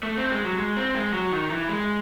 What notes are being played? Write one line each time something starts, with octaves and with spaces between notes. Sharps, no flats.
A3
C4
G#3
F#3
G#3
C4
G#3
F#3
D#3
E3
G#3